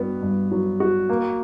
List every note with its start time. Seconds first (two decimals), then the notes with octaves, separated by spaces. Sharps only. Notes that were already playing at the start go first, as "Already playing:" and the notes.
Already playing: G2 B3 F#4
0.22 G2
0.52 F#3
0.80 F#4
1.10 A#3